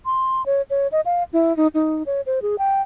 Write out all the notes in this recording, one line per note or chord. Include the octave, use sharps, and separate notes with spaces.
C6
C#5
C#5
D#5
F5
E4
D#4
D#4
C#5
C5
G#4
G5